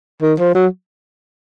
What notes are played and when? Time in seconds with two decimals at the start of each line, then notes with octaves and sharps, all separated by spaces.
0.22 D#3
0.39 F3
0.55 F#3